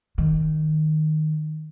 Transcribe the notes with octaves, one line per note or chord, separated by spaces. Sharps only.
D#3